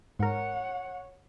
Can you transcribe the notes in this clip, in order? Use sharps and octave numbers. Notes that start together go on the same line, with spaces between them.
G#2 A#4 C#5 F#5